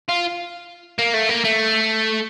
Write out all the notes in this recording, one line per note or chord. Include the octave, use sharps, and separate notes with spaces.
F4
A#3
A3
A#3
A3